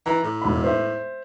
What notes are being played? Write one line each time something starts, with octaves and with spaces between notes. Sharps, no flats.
E3 A#5
A2
E1 B5
C5 E5